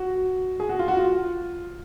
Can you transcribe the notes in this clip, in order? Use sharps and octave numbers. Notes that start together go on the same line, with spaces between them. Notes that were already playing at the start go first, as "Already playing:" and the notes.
Already playing: F#4
G#4
F#4
F4
F#4
F4